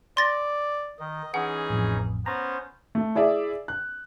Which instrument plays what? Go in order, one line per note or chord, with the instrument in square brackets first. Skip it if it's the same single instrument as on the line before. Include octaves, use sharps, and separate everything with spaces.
[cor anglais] D5 [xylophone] C6 A6 A#6
[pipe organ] D#3 [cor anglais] D#5
[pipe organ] E3 C#4 D#4 [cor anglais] G#4 [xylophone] F#5
[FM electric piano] A1 F2
[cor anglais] B3 [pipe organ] C#4 C5 [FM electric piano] A#5
[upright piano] A3
E4 G#4 D5 E5
F#6